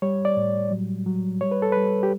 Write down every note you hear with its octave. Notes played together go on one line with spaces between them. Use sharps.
G3 C#5
D5
A2
F#3
F#3
G3 C#5
B4
A4
G3 B4
G4